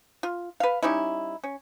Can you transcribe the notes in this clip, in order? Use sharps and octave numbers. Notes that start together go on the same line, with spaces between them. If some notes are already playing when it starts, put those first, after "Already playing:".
F4
B4 F5
G3 C#4 D#4 E4
C#4